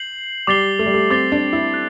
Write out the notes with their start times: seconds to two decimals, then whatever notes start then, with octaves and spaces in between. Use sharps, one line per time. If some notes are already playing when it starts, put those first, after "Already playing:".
Already playing: G6 C7 F#7
0.47 G3 D6 A6 C7 G7
0.79 A3
0.86 G3
0.94 A3
1.11 C4 D6 A6 C7 G7
1.32 D4
1.53 E4
1.74 F#6